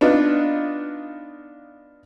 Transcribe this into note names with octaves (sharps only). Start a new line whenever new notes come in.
B3 D4 D#4 F4